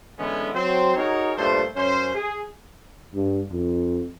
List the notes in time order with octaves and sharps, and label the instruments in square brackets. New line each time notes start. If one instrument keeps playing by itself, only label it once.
[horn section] D3 E3 G#3 B3 C#4 E4
F#3 C4 C5
D#4 F#4 G#4 A#4 C#5
G2 A#2 A3 C5
F#2 C#4 C5
G#4
[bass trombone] G2
F2